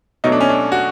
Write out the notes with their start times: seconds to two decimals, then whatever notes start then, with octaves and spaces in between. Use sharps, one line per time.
0.24 B1 B2 F#3 A3 D#4
0.32 D4
0.40 C#4
0.49 D4
0.72 F#4